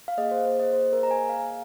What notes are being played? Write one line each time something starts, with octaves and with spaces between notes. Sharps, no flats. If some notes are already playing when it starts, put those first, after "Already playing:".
F5
A#3 G#4 D#5
C5
C5
D#5
C5
A#4
A#5
G#5
F5